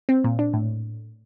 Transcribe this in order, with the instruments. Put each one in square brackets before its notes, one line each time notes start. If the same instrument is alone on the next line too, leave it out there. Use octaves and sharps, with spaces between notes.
[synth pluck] C4
A#2
D4
A2